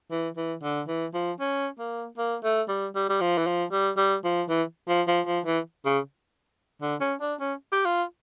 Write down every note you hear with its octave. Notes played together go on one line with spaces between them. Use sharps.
E3
E3
D3
E3
F3
C#4
A#3
A#3
A3
G3
G3
G3
F3
E3
F3
G3
G3
F3
E3
F3
F3
F3
E3
C#3
D3
C#4
D4
C#4
G4
F4